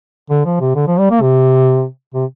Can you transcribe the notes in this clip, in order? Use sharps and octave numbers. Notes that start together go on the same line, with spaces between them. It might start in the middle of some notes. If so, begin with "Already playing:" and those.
D3
F3
C3
D3
F3
G3
A#3
C3
C3